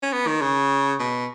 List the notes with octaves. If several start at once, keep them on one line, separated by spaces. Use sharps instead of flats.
C#4
B3
D#3
C#3
B2